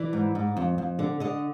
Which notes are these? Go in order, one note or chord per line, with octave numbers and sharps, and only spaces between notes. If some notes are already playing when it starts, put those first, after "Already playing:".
Already playing: E3 D5
G#2
G#2
F2
F2
D3
D3 D#5